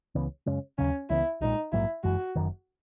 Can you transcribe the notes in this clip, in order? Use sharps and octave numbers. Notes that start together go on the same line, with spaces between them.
C#2 C#3 E3 B3
F#2 C#3 G#3 C#4
D#2 C#3 F#3 C#4
C#2 C#3 E3 B3 E4
B1 A#2 G#3 D#4
A#1 G#2 F#3 A#3 E4
F#1 F#2 E3 G#3 F#4
F#1 F#2 D#3